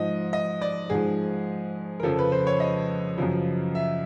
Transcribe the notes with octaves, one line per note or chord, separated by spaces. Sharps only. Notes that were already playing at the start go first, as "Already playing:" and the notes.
Already playing: G#2 F3 D#5
D#5
D5
G#2 F3 G#4
A#4
F2 C#3 F3 A4
B4
C5
C#5
D#5
F#2 C#3 F3
E5